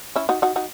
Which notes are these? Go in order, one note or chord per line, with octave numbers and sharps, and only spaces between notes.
C#4 E4
D#4 F#4
D#4 F#4
D#4 F#4